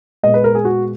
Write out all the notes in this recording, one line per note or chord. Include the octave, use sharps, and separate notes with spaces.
A#2 G#3 B3 D#5
B4
A#4
G#4
F#4